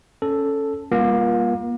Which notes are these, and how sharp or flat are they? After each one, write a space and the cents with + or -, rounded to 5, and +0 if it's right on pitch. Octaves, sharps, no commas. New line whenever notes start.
C#4 +0 A4 +0
G3 +45 A#3 +35 F4 +0